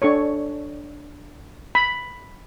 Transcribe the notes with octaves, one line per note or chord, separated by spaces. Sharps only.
D4 A4 C#5 C#6
B5